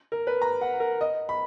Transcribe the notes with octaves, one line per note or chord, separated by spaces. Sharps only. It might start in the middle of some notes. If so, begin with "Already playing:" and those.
A#4
B4
A#5
F#5
A#4
D#5
B5